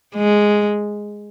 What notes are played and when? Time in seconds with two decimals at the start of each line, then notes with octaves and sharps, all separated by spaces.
0.15 G#3